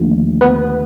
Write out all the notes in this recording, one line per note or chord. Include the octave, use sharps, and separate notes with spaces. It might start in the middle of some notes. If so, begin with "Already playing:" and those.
Already playing: D#2 D3 F3 A3
B3 B4